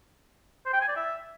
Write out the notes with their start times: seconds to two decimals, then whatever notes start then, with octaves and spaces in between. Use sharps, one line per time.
0.66 C5
0.73 G5
0.81 G#5
0.89 D5
0.96 E5